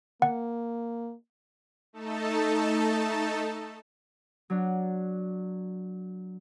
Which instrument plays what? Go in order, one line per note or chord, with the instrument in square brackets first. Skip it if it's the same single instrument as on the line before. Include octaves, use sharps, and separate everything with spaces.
[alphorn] A#3 [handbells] F#5
[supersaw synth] A3 D#4 A4 A5
[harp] F#3 D4